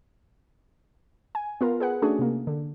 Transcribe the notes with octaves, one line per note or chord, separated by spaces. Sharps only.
G#5
B3 F4 A#4
G#4 B4 F#5
A3 C#4 D4 F#4 G#4
C3 A#3
D3